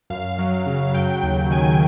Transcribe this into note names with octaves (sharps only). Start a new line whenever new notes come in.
F#2 F5
F#3
C#3
F#3 G5
D#2 G5
D#3 G#5